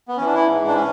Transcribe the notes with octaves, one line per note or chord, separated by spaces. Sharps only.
B3
E3 C#4
D4
E4
G#2
D4
C#4